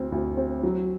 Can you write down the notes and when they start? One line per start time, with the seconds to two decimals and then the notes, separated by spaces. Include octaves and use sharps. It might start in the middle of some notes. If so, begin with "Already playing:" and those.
Already playing: D2 C4
0.12 D2
0.37 C4
0.63 F#3